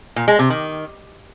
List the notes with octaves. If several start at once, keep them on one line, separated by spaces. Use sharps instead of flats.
A#2
G#3
C3
D#3